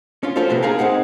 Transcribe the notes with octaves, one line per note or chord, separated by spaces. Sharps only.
C#4 F4
F3 C#4 F4 A4 C5
C3 F3 B3
D#4 F4 G#4 A#4 F5 G#5
C4 D#4 G#4 F#5